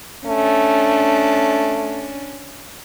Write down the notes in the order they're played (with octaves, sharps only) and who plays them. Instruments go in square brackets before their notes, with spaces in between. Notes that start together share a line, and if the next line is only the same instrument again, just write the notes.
[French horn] A3 [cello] C#4 D4